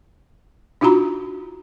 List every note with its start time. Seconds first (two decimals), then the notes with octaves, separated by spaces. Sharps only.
0.81 D4 D#4 F4 F#4 A#5 B5